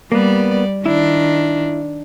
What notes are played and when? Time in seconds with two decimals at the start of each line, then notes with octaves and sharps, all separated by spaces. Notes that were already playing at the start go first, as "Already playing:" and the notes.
0.12 G3 A#3 B3 D5
0.86 D#3 D4 E4